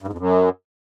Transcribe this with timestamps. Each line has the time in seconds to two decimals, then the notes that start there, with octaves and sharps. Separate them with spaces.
0.02 G2
0.08 G#2
0.13 F2
0.18 F#2